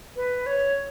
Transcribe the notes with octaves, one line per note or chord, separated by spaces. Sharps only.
B4
C#5